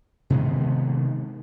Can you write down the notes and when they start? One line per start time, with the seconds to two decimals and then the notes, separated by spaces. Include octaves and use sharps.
0.30 C3 D#3 G#3 B3